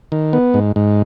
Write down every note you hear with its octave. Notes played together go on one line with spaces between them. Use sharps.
D#3
B3
G#2
G#2